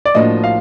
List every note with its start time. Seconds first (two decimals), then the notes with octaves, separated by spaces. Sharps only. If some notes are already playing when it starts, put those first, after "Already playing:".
0.05 D5
0.14 A2 F3 A#3 D4 F#4 D#5
0.44 F5